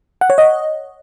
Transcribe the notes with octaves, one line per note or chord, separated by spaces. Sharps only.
F#5
C#5
D#5